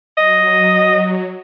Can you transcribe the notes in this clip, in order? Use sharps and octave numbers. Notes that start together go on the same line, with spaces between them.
F#3 D#5